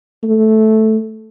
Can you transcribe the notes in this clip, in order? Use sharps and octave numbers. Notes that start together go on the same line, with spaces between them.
A3